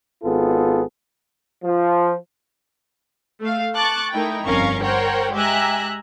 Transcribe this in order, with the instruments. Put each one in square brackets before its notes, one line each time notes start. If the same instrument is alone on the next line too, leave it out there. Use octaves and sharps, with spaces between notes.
[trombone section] G#1 B3 F4 G#4 A4
F3
[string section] A3 F5
A5 C#6 D6 F#6 A6
A3 D#4 E4 A#4 G5
G1 F2 C#4 A#4 F5 C#6
A#4 C5 C#5 F#5 G5
G#3 G4 E5 G#5 A#5 F#6